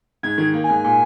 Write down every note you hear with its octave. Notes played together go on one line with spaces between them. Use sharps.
G#2 G#6
D#3
A#3
G#5
G#2
A#2